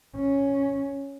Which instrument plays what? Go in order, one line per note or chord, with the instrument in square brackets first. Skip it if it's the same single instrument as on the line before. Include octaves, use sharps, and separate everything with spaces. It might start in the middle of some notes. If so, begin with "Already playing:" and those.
[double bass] C#4